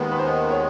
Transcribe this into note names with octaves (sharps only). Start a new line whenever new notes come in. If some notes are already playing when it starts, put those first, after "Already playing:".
Already playing: D#2 D#3 G#3 B3 B4
B4
C5
C#5